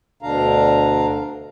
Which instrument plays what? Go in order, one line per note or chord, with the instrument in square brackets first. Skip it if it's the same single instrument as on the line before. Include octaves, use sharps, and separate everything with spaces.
[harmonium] D2 B2 D3 D4 F5 A#5